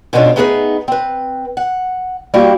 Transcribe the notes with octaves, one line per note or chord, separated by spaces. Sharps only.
G#2 B2 B3 C#4 D4 F4
A3 B3 D#4 G#4 A4 B4
C4 B4
F#5
G3 A#3 D4 E4 F#4 G4